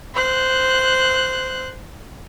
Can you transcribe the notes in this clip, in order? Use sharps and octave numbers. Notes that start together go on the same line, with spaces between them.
C5 F#6